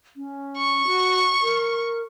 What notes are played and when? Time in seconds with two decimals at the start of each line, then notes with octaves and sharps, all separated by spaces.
0.17 C#4
0.57 C#6
0.87 F#4
1.42 A#4